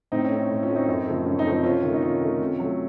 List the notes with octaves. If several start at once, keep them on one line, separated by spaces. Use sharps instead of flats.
A2 C4 D#4
C#4
A3
C#4
A2
C#4 F4
A3
C4 D#4
F#2
C#3 F3 A3
F#2 C#4
C4 D#4
C#3 F3 A3
C4 D#4
C3 C#4 F4
D#3 A3
D#4
C3 C#4 F4
D#3 A3
C3
F#3 A3